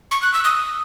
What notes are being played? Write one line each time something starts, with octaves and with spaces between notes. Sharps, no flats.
C#6
F#6
E6
D#6